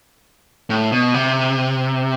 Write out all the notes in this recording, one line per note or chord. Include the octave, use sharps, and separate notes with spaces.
A2
B2
C3